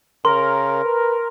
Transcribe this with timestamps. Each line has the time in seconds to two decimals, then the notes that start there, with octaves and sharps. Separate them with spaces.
0.25 C#3 A#4 C6
0.85 B4